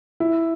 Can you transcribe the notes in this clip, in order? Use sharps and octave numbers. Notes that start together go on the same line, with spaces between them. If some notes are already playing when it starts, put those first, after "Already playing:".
E4